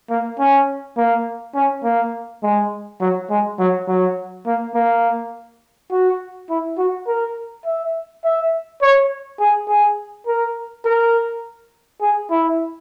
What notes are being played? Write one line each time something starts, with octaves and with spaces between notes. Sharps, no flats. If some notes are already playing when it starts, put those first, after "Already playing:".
A#3
C#4
A#3
C#4
A#3
G#3
F#3
G#3
F#3
F#3
A#3
A#3
F#4
E4
F#4
A#4
E5
E5
C#5
G#4
G#4
A#4
A#4
G#4
E4